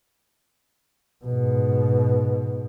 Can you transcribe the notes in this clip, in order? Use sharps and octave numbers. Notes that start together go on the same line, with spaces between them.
G#2 B2